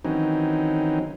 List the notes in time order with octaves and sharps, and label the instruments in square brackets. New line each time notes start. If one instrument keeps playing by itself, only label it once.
[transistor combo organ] D#3 E3 F#3 C4 C#4 D#4